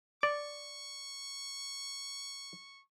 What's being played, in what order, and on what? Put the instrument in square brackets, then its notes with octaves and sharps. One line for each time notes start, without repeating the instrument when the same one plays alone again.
[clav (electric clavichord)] D5 [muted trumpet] C#6